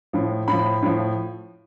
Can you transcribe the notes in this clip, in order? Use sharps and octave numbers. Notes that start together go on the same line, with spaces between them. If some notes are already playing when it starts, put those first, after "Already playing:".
A2 F3
A2 F3 B5
A2 F3